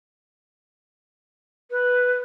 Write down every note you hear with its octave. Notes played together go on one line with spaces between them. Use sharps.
B4